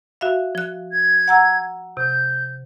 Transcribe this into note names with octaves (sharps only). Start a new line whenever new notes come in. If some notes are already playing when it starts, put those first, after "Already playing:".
F#4 E5 F5
F3 F#6
G#6
F#5 A#5 E6
C3 G6